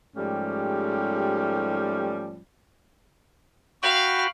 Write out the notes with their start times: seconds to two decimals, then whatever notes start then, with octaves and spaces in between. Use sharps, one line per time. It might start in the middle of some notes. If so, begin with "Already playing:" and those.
0.16 G#2 F3 G3 A3 C#4 G4
3.83 F#4 F5 G5 B5